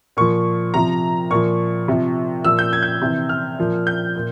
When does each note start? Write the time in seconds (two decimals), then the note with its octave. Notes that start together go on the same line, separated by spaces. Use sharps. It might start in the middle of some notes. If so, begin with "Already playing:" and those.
0.17 A#2 F3 C#6
0.74 C3 F3 A#5
1.30 A#2 F3 C#6
1.88 C3 F3
2.45 A#2 F3 E6
2.59 G6
2.73 G#6
2.82 G6
3.02 C3 E3
3.29 F6
3.59 A#2 F3
3.87 G6
4.15 A#2